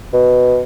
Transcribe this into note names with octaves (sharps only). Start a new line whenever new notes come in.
B2